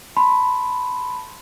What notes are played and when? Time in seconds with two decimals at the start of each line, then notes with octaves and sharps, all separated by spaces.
0.17 A5 B5 C6